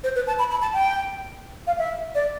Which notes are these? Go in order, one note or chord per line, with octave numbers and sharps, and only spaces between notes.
C5
B4
A5
B5
B5
A5
G5
F5
E5
D5